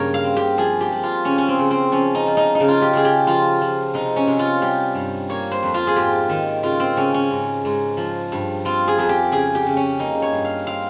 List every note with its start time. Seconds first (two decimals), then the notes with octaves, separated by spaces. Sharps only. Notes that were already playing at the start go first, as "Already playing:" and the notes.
Already playing: G2 C#3 A#3 A#4 C#5
0.14 F5
0.24 C4
0.36 G4
0.58 F3 G#4
0.81 G4
0.92 F3
1.03 F4
1.25 C#3 C#4
1.38 C#4
1.48 C4
1.59 C#3
1.71 C4
1.92 F3 C#4
2.15 D#4
2.26 F3
2.37 D#4
2.55 D#4
2.60 C#3
2.68 F4
2.82 G4
2.93 C#3 G#4
3.05 G4
3.27 F3 F4
3.61 F3
3.94 C3 D#4
4.16 C#4
4.27 C3
4.39 F4
4.61 G3 G4
4.95 G2
5.29 A#3 C#5
5.51 C5
5.63 F2
5.74 F4
5.87 G#4
5.96 G#2 G4
6.29 D#3
6.63 C#3 F4
6.80 C4
6.96 C#3 C#4
7.14 C#4
7.30 G#2
7.65 G#2
7.97 F3
8.32 G2
8.65 C4 F4
8.88 G#4
8.98 F2 G#4
9.09 G4
9.32 C#3 G#4
9.55 G4
9.66 C#3
9.77 C#4
9.99 A#3 D#4
10.22 C#5
10.33 G2
10.44 F5
10.66 C4 F5